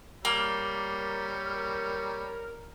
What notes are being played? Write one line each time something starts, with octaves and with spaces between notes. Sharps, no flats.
G3 A#3 A#4 C#5 A#5 F6 G7